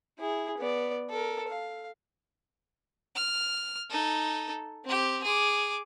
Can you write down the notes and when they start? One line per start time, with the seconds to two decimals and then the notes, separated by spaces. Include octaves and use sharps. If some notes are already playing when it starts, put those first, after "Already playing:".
0.19 E4 G#4
0.58 B3 D5
1.10 A4 A#4
1.48 F5
3.15 F6
3.90 D#4 A4
4.84 C4 G4
5.24 G#4 D6